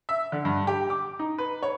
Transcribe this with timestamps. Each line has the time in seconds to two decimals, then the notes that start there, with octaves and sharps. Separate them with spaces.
0.09 E5
0.32 D3
0.45 G2
0.67 G4
0.90 D6
1.19 D#4
1.38 B4
1.63 C#5